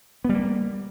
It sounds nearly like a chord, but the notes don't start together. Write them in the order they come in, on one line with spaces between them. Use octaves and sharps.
B3 G3 A#3